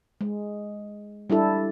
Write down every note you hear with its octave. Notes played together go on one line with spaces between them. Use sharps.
G#3
G3 D4 E4 A4